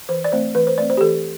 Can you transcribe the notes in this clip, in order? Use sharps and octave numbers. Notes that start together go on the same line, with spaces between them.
E3 C5
D5
A3 C4 C5
E3 B4
C5
A3 C4 D5
C5
G4
E3 A4